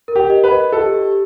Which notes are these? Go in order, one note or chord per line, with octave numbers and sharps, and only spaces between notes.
A#4
G4
D#5
B4
D#5
G4 A4
G4